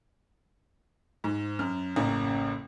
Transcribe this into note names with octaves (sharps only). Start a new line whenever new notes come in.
G#2
F#2 F6
A1 F#2 C#3 A#3 A#5